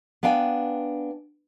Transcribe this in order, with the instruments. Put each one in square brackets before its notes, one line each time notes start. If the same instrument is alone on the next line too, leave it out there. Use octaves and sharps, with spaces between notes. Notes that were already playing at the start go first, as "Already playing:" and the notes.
[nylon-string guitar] B3 D4 F5 G5 G#5